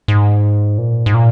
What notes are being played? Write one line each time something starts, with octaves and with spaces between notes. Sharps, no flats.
G#2
A#2
G#2
A#2